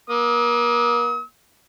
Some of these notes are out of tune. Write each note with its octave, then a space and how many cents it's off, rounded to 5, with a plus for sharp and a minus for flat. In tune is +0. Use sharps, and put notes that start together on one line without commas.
A#3 +35 D#6 +45